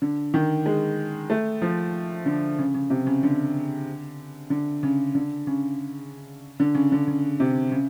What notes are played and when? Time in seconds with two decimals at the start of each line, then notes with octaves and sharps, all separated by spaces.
0.02 D3
0.34 D#3
0.66 G#3
1.30 A3
1.62 F3
2.26 D3
2.58 C#3
2.75 C#3
2.90 C3
3.07 C#3
3.23 D3
4.50 D3
4.83 C#3
5.15 D3
5.47 C#3
6.60 D3
6.75 C#3
6.92 D3
7.08 C#3
7.40 C3
7.72 C#3